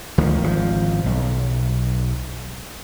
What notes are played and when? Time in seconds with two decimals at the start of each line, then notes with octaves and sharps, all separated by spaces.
0.18 D2 D#3 F3
0.42 G#1 D3 F3
1.06 B1